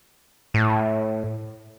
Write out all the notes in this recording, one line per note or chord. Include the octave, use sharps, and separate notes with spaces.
A2